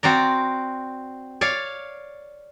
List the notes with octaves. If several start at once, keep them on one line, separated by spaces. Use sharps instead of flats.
C4 F#4 D5 A#5
C#5 D5 F5